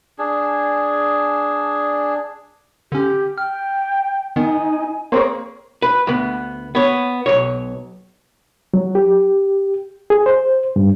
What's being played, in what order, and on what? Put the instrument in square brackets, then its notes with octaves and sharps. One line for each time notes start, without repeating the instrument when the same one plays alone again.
[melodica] D4 G#4
[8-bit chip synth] D3 C#4 [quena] G4
[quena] G5 [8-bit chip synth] F6
[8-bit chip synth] D#3 B3 [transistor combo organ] D#4 [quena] G#5
[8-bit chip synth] A#3 C4 G#4 [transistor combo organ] A#4 C5 C#5
[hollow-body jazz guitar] B4
D2 B3
B3 C#5
B1 A#2 C#5
[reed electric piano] F#3
G4
G#4
C5
G2